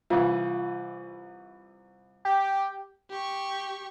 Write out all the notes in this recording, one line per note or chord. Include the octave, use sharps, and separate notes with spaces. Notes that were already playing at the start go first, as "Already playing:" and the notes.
C2 E3 F4 F5
G4
G4 C#6